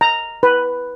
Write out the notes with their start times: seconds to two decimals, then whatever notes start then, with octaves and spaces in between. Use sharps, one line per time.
0.01 A#5
0.43 B4